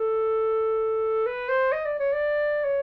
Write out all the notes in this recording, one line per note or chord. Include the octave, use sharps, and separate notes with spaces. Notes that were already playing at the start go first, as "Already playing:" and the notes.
Already playing: A4
B4
C5
D#5
D5
C#5
D5
C#5